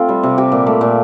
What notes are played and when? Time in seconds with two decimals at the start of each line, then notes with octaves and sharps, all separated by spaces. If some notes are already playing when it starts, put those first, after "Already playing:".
Already playing: A3 C4 F4
0.09 G3
0.23 C3
0.38 C4 G4
0.52 A#2
0.67 A3
0.81 A#2